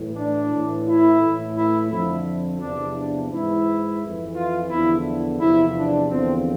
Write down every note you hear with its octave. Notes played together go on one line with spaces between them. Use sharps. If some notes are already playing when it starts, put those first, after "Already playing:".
Already playing: A2 E3
D4
A2 E3
E4
A2 E3
E4
F2 D3 F3 E4
E2 C3 F3 D4
D4
G#2 E3 E4
F2 E3
F4
E2 D3 F3 E4
E2 C3 F3 E4
D4
E2 D3 F3 C4